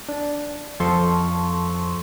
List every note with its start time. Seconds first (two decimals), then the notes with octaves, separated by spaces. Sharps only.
0.09 D4
0.80 F2 F3 A4 C6 C#6